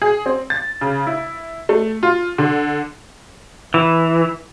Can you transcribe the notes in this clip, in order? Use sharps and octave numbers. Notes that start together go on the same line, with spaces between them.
G#4
C4
A6
C#3
E4
A3
F4
D3
E3